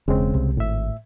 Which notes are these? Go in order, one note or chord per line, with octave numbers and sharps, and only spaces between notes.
E1 C#3 G#3 C4
C2
G#1 A2 E5